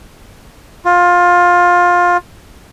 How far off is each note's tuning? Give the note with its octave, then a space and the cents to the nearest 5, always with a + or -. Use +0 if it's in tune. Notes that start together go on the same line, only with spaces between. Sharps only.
F4 +20